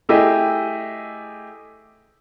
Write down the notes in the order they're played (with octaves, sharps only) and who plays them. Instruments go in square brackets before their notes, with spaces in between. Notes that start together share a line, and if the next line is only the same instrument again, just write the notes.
[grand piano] A3 E4 G4 G#4 D#5